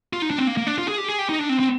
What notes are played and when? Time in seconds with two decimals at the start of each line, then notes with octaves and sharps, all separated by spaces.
0.13 F4
0.22 D#4
0.30 D4
0.38 C4
0.47 A#3
0.57 A#3
0.67 D4
0.78 F4
0.88 G#4
0.98 G4
1.08 G#4
1.19 G4
1.29 D#4
1.39 D4
1.49 C4
1.60 C4